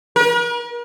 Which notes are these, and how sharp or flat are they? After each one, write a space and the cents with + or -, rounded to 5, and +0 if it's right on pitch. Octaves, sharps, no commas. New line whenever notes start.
A#4 +45